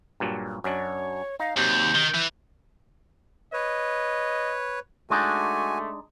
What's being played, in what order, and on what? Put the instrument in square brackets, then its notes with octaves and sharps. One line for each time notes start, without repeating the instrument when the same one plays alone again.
[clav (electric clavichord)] G2 A#2 F#3
[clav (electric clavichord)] F#2 D4 [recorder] C#5
[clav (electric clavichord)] D#4 [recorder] F5
[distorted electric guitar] D#2 [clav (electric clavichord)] C3 F#3 [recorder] G6
[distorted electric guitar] D#3
E3
[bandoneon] B4 C#5 [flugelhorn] D#5
[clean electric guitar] G#3 D4 D#4 [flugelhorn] A3 [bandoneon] F#4 G#5